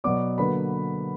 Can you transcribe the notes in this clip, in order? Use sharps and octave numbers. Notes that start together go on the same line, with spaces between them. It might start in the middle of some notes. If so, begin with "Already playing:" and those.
B2 F#3 B3 D5 D6
D3 F#3 A#3 B4 B5